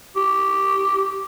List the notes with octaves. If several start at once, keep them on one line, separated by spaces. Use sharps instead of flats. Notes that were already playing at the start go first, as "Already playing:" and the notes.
G4